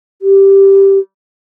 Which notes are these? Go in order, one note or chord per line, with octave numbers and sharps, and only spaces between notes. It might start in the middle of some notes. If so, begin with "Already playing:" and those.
G4